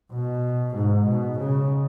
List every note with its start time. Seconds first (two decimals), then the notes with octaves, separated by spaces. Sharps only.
0.13 B2
0.75 G#2
1.07 B2
1.39 C#3